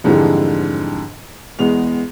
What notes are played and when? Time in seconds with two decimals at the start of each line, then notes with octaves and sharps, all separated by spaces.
0.04 F2 G#2 D3 E3 G3 G#3
1.59 E2 G#3 B3 F7